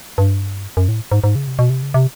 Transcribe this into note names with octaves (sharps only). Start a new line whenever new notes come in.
G2
F#2
A2
G#2
G#2
C#3
C3
B2
C3
C#3
C3